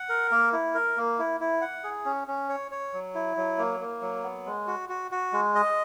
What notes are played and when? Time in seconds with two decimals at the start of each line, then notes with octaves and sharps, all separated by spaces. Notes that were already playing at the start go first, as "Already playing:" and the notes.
Already playing: F#5
0.09 A#4
0.31 A#3
0.53 E4
0.75 A#4
0.97 A#3
1.19 E4
1.40 E4
1.61 F#5
1.84 G#4
2.05 C#4
2.28 C#4
2.49 C#5
2.71 C#5
2.93 F#3
3.14 E4
3.37 F#3
3.58 A#3
3.80 A#3
4.02 F#3
4.23 B3
4.46 G#3
4.67 F#4
4.89 F#4
5.11 F#4
5.32 G#3
5.55 D#5